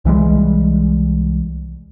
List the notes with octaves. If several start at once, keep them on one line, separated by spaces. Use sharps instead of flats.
C2 E3 G3 G#3